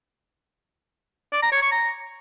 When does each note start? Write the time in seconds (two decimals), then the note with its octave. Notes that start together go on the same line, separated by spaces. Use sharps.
1.33 D5
1.43 A#5
1.52 C#5
1.62 C#6
1.72 A#5